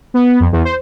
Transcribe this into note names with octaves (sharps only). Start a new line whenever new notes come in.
B3
F2
E2
C5